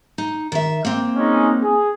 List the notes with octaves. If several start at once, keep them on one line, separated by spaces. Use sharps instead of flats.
D#4
D#3 E5
A#3 C4
G#3 C#4 D#4
G#4